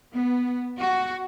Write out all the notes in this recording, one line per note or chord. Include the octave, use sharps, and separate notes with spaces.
B3
F#4